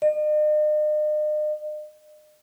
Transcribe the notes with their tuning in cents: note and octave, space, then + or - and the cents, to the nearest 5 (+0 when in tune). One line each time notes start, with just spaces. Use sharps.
D#5 -45